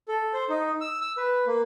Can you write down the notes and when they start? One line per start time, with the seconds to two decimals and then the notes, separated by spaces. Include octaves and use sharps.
0.08 A4
0.33 C5
0.49 D#4
0.81 E6
1.01 E6
1.17 B4
1.46 A#3